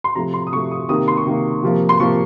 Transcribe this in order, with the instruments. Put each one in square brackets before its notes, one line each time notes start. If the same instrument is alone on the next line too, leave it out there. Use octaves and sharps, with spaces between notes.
[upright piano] C6
C3 F3 A3 A#5
C6
D#6
C3 F3 A3 C#6
D#6
C3 D#3 A#3 D#6
C6
C#6
C3 D#3 A#3
C3 F3 A#3
C6
C3 F3 A#3 C#6